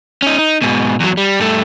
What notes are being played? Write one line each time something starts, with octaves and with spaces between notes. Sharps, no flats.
C#4 D#4
D#4
G#2 B2
E2 F#3
G3
G2 A3